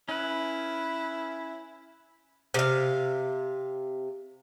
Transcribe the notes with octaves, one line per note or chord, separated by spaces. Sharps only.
C#4 E4 B4
C3 F5